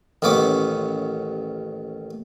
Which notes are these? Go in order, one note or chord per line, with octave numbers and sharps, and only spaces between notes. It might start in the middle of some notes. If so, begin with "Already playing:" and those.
A1 D#2 B3 C#4 D6